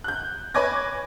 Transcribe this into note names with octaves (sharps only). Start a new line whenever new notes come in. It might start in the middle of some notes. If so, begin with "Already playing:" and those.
F#6 G6
B4 C#5 G#5 D6 G#6 A#6